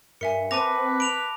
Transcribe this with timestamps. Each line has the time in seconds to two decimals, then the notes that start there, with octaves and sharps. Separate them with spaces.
0.21 G2 A#4 E5 G#5 C#7
0.51 C4 B4 A5 D6 A#6 D#7 F7
1.00 B5 D7 F7